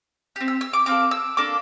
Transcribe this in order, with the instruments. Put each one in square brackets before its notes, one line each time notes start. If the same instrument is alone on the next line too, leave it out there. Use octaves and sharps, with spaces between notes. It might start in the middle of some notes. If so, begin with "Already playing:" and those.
[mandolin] C4 G4
E6
E6
D6
C4 F4 A4 D6
E6
A#3 D4 A4 D6